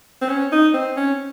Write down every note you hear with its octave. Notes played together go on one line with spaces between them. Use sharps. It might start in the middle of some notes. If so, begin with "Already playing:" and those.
C4
C#4
D#4
C4
C#4